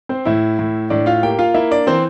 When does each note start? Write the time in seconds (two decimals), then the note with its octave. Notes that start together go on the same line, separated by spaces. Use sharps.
0.09 C4 C5
0.25 A2 E4 E5
0.59 A2
0.90 A2 D4 D5
1.06 F4 F5
1.23 A#3 G4 G5
1.39 F4 F5
1.54 A#3 E4 E5
1.71 D4 D5
1.87 E3 C4 C5